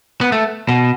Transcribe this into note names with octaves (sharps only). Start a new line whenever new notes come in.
B3
A3
B2